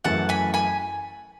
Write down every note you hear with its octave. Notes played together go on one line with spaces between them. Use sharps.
F#2 E3 A3 F#5 A5
G#5 B5
G#5 B5